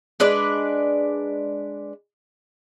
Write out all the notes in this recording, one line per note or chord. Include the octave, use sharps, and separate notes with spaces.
G#3 D4 B4 D5